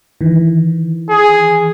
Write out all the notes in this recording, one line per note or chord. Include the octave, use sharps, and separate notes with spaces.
D#3 E3
G#4